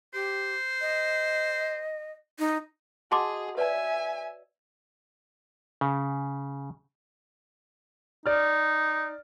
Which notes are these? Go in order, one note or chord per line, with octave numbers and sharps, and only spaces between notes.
G4 C5
D#5
D#4
F#4 G#4 D#5 F#5 A5 C6 D6
B4 C#5 D5 E5 G#5
C#3
D#4 D5 F6